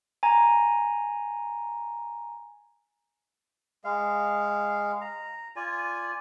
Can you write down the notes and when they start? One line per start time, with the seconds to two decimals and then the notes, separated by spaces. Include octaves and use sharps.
0.23 G#5 A#5
3.84 G#3 F5
5.01 A#5
5.56 F4 D5 G#5